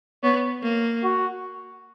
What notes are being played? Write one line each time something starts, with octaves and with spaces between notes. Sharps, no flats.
B3 C#5
A#3
F#4